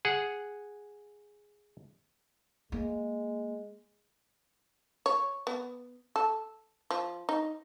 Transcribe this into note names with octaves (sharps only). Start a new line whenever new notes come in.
G#4 F#5
G#3 A#3
C#5
B3
A4
F3
D#4